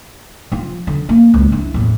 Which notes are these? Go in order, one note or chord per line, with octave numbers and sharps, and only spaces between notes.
F3 F4
D3
A#3
C#2
D4 E4
E2 A2